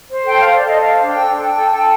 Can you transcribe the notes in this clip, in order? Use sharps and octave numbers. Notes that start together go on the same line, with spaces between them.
C5
A4 G5
F5
C5
D5
A4 D#5
C5 F5
D4
G5
A4
A4 G5
A4
A4